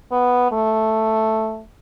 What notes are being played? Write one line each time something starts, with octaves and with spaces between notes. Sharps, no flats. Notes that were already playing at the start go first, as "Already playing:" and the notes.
B3
A3